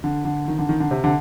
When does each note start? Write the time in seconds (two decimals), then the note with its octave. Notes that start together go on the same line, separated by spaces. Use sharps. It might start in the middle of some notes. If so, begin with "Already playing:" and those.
0.04 D3
0.25 D3
0.48 D#3
0.59 D3
0.69 D#3
0.80 D3
0.91 C3
1.04 D3